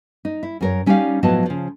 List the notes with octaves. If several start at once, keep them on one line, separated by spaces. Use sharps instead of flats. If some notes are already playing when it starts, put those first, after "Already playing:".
D#4
E4
F#2 A#4 C#5
G3 C#4 D#4 G4 D5 F5
A2 F3 F#3 B3 D#5 A5
C#3 F3